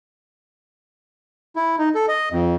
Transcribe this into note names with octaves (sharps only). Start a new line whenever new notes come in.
E4
D#4
A4
D#5
F2